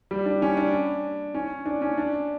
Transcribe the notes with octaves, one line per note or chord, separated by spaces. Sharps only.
G3
D4
C#4
D4
C#4
D4
C#4
D4